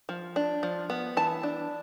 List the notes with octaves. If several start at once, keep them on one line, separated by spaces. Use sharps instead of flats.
F3
D4
F3
B3
E3 A5
D4